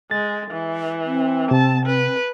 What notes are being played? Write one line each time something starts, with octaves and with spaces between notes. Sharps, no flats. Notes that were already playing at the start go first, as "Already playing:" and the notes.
G#3 A6
E3
C4
C3 A5
B4